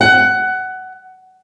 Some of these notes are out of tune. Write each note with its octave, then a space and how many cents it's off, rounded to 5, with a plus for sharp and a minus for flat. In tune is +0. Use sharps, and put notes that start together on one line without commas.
F#5 +15